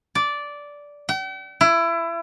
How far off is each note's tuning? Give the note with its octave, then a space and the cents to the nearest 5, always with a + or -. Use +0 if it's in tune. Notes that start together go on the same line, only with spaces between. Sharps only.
D5 -10
G5 -45
E4 +25